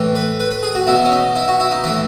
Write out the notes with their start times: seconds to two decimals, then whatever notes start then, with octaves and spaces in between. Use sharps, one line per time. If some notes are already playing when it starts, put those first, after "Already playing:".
Already playing: A2 E3
0.15 B4
0.40 B4
0.51 B4
0.63 G#4
0.75 F#4
0.87 B2 F#3 E4
1.05 C#4
1.12 D#4
1.35 E4
1.48 F#4
1.60 E4
1.71 D#4
1.84 A2 E3 E4